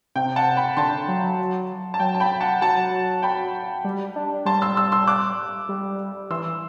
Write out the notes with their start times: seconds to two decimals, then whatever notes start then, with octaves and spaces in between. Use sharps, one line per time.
0.15 C3 G5
0.36 F#5 A5
0.56 G5 B5
0.77 D3 A5 C6
1.08 F#3
1.94 A5
2.00 F#3 G5
2.15 A5
2.20 G5 B5
2.41 F#5 A5
2.61 F#3 F#5 A5
3.22 G5 B5
3.84 G3
4.16 D4
4.45 G3 A5 C6
4.62 C6 E6
4.76 C6 E6
4.92 C6 E6
5.07 D6 F#6
5.69 G3
6.30 E3 C6 E6